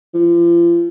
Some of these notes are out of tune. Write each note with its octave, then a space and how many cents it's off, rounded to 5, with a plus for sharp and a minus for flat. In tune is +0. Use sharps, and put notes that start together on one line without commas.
F3 -40